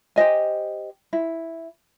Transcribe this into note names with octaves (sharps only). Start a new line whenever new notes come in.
G4 C5 D#5 G#5
E4